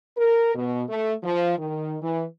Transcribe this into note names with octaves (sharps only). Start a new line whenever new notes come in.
A#4
B2
A3
F3
D#3
E3